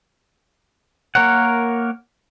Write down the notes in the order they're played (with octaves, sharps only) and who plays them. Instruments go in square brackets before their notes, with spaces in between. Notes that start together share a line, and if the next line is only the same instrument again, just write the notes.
[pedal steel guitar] A#3 A#4 C#5 F#5